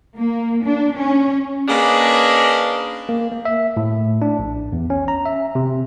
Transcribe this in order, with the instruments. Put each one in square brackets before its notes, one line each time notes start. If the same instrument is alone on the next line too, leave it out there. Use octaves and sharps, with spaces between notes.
[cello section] A#3
D4
C#4
[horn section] A#3 C#4 D4 G#4 B4 D#5
[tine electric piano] A#3
A#3
E5
A2
D4
A#1
E2
C#4
A#5
E5
C3